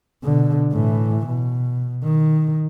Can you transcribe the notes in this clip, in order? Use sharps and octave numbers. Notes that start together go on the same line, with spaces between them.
B2 D3
A2 E3
B2
D#3